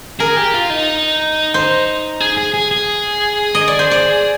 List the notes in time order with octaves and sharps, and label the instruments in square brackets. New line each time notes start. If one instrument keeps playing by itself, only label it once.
[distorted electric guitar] G#4 [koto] A#4
[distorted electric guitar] G4
F4
D#4
[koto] C5
[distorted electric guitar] G#4
G#4
G#4
G#4
[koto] D#5
D5
C5
D5